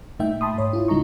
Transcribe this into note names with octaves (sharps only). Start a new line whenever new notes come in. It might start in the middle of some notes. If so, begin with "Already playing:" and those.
A#2 A3 D#4 E5 G5
A5 B5 C6 D#6
G#2 C#5
E4 F4
D2 C#3 G#3 D#4 A#5 C#6